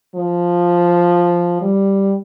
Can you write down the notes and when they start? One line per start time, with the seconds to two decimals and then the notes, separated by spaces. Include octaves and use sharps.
0.15 F3
1.61 G3